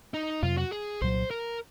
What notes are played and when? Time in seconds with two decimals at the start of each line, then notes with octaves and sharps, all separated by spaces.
0.14 D#4
0.42 F2 C3 F#3 F4
0.58 F#4
0.72 G#4
1.01 C2 A#2 F#3 C5
1.31 A#4